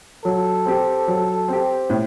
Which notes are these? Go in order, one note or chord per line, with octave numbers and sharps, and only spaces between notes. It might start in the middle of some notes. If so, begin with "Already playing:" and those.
F#3 A4
C4 G4
F#3
C4 G4
A2